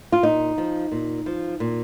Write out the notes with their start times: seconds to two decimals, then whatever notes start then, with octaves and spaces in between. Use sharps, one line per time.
0.12 F4
0.23 A#2 D#4
0.58 F3
0.92 A#2
1.26 F3
1.60 A#2